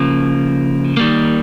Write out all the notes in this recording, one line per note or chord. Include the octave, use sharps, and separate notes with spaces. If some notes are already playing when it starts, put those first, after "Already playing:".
Already playing: C#3 F3 A#3
D#3 G3 A#3